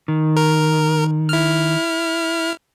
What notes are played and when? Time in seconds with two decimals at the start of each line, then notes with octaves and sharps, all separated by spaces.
0.08 D#3
0.36 A#4
1.29 E4 F6